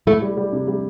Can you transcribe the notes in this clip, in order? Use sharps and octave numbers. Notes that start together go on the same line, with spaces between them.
A3 E4
G3
G3
C3
G3